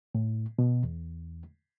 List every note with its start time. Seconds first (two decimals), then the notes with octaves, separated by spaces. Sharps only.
0.15 A2
0.59 B2
0.84 E2